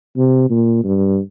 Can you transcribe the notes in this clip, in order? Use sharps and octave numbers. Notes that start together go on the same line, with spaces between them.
C3
A#2
G2